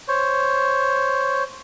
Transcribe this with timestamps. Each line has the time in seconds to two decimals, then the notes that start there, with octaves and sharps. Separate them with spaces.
0.08 C5 C#5